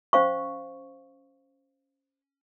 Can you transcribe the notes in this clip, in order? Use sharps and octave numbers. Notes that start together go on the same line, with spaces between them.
C#4 C5 F5 C#6